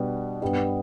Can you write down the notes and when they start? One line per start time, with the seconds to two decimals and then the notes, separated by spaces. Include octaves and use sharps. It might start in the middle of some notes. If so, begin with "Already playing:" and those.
Already playing: B2 G3 B3 D4
0.42 G2 G3 B3